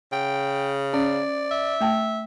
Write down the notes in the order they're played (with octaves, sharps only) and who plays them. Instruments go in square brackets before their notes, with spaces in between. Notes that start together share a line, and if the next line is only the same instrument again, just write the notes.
[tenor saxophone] C#3 [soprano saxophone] G5
[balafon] C#4 [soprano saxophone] D5
[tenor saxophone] E5
[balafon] A3 G5 A5